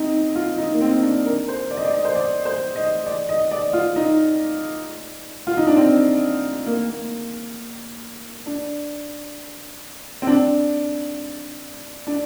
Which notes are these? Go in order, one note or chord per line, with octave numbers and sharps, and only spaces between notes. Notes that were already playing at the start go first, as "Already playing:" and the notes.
Already playing: C4 D#4
F4
D#4
A#3
C4
D4
A#4
C5
D5
D#5
D5
D#5
C5
D5
C5
D#5
D5
D#5
D5
F4
D#4
F4
D#4
D4
C4
A#3
A#3
D4
C4
D4
D4